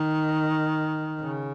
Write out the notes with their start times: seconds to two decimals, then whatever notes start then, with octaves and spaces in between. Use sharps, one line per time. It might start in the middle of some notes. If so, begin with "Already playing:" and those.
Already playing: D#3
1.20 C#3